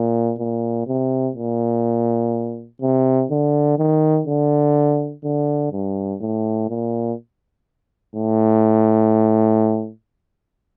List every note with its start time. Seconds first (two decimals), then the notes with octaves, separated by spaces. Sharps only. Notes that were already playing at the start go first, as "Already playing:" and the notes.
Already playing: A#2
0.39 A#2
0.87 C3
1.36 A#2
2.82 C3
3.30 D3
3.79 D#3
4.27 D3
5.24 D3
5.72 G2
6.21 A2
6.69 A#2
8.15 A2